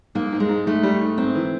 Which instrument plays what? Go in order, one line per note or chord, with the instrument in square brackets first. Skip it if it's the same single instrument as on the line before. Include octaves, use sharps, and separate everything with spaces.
[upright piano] G#2 [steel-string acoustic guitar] A#3
[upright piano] G#2
[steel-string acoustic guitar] G#3
[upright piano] G#2
[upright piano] G#2 [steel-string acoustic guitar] A3
[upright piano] G3
G#2
[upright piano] G#2 [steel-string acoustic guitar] C4
[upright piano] E3